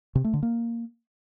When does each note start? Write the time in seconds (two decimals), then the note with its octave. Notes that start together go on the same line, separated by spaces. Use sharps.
0.15 C3
0.24 A3
0.34 D3
0.43 A#3